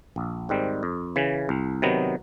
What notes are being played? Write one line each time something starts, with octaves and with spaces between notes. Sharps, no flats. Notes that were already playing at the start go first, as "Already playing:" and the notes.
A#1
G#2 D#3 G3 C4
F2
C#3 E3
C2
C3 D#3 F#3 B3